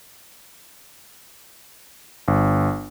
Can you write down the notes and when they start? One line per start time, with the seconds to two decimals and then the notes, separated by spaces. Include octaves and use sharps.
2.28 G1